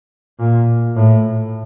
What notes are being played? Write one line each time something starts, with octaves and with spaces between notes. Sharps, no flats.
A#2
A2